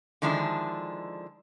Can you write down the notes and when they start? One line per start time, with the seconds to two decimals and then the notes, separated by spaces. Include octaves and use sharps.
0.22 D3 D#3 F3 G#3 D4 E4